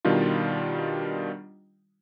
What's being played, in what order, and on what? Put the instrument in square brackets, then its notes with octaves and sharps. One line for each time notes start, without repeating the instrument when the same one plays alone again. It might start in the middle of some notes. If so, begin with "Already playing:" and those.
[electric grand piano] B2 D#3 G3 D4 F4